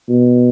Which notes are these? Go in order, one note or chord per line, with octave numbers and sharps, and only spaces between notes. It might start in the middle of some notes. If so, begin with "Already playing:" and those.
B2